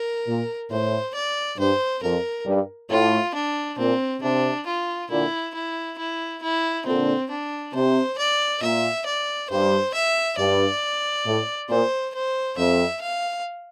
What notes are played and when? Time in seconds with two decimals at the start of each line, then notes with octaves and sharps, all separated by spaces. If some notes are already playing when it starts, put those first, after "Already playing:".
Already playing: A#4
0.28 A#2
0.70 A2 C5
1.15 D5
1.58 G2 C5
2.03 F2 A#4
2.46 G2
2.90 A2 F4
3.35 D4
3.78 A#2 C4
4.22 C3 D4
4.66 F4
5.10 A#2 D3 E4
5.55 E4
5.98 E4
6.42 E4
6.86 A#2 D3 C4
7.30 D4
7.74 C3 C5
8.18 D5
8.62 A#2 E5
9.06 D5
9.50 G2 C5
9.94 E5
10.38 G2 D5
11.26 A2
11.69 A#2 C5
12.15 C5
12.58 F2 E5
13.02 F5